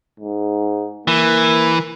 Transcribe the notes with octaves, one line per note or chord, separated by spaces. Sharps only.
G#2
E3 A#3